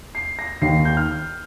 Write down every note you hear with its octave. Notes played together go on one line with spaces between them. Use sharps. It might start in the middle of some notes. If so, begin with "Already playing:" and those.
C7
A#6
D#2 D#3 C7
G6
F6